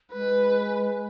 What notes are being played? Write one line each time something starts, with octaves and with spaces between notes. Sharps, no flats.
G#3 B4